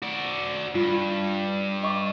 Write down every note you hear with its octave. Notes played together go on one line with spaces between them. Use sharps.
F#4 D5
G2 F4
D#5 C#6 D6